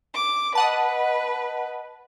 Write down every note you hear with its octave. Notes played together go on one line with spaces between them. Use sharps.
D6
B4 D#5 F#5 A5